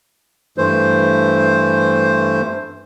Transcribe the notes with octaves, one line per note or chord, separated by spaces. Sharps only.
G2 E3 A3 C5